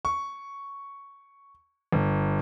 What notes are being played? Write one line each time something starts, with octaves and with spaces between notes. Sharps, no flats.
C#6
G1